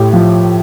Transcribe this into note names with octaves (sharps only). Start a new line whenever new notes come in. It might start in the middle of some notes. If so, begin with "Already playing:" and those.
Already playing: A2 G4
F3